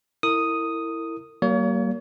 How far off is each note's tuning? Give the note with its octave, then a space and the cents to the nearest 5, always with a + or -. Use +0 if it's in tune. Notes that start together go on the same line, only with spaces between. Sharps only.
E4 +0 A#4 -35 D#6 +0
G3 -40 A#3 +0 C#5 +35